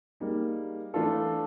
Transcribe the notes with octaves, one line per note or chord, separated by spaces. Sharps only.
G3 A#3 D#4 G#4
E3 A3 D4 F4 A4